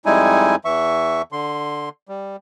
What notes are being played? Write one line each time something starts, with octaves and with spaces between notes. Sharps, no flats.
F2 G3 G#3 D#4 E4 G#5
E2 E3 E5 C#6
D3 C6
G3